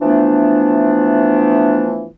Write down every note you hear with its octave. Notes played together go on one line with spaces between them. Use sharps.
E3 F3 A3 B3 D4